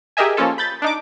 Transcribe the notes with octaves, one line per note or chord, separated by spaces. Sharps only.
G4 G#4 A#4 D#5 E5 G#5
F3 A#3 C#4 F4 A4
B5 G6 A6
D4 D#4 D6